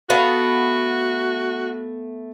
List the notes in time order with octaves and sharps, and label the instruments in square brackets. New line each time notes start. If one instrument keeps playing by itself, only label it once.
[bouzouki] A3 B3 F5 [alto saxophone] F#4